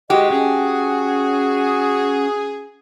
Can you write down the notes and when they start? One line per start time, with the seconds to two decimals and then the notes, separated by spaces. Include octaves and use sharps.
0.10 G#3 F#4 G4 D#5
0.31 C#4 G#4